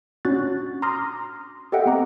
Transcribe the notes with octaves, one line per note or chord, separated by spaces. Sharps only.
C#4 D4 F#4 F#6 A6
A#5 C6 D6 D#6 F6 A#6
G4 A4 D#5 E5 F#5 G5
B3 C4 A#5 D6